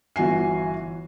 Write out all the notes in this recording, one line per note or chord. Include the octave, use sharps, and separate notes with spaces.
G1 E3 F#4 G#5 C7